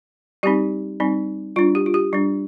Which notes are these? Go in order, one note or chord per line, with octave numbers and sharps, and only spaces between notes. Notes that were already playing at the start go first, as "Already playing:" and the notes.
G3 C4 D#4 G4
G3 C4 D#4
G3 D4 F4
G4
F4
G4
G3 D4